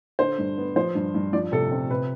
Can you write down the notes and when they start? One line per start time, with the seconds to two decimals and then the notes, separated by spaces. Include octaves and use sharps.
0.19 D3 C5
0.38 G2
0.58 B3
0.76 F3 C5
0.95 G2
1.15 G2
1.33 F3 D5
1.52 C3 A4
1.72 C4
1.91 C3 B4